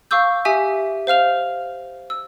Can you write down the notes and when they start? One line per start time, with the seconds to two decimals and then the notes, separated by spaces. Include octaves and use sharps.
0.11 F5 C#6 D6 E6 G6
0.45 G4 E5 G#5 D#6 B6
1.07 C5 F5 F6 F7
2.10 E6